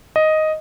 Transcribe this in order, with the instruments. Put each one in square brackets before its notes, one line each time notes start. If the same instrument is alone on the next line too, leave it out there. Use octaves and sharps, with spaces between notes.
[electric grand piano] D#5